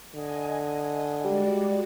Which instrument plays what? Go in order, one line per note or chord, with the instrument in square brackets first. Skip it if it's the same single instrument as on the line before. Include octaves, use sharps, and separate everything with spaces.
[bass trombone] D3 [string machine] D#5 G#5
[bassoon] G3 [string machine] G#3 F#4 D5